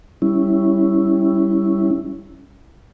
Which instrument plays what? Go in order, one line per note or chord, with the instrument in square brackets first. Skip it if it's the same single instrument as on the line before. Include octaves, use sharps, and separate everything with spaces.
[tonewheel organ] G3 C#4 E4